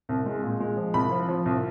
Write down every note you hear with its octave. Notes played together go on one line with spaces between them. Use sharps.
C2
G#3
A#2
G#3
F3
C2 B5
F3
F3
C2